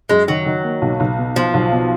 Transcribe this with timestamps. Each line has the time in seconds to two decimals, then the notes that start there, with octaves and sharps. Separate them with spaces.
0.09 F#2 G#3
0.28 D#3 F#3
0.46 D#3
0.64 A#3
0.82 B1
1.00 B1
1.18 B2
1.36 B2 F3
1.54 B1
1.72 B2